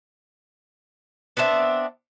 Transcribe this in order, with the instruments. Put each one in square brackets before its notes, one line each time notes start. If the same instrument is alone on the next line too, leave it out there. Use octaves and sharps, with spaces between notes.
[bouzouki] B3 C4 D4 E5